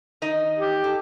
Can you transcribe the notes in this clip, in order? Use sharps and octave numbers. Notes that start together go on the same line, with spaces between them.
D#3 D#4 D#5
G4
A4